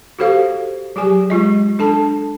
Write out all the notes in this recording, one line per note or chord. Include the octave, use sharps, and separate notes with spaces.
F#4 G4 A4 C5 F5
F#3 G4 G#4 G#5
G#3 F4 D#5
D4 A4 A5